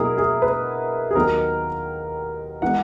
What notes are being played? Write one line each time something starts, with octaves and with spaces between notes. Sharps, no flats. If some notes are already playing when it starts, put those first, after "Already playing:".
Already playing: B2 F#3 A#3 E4 G#4 A#4
G#4
B4
G#4
D#2 D#3 F#3 B3 A#4
E3 G#3 B3 F#5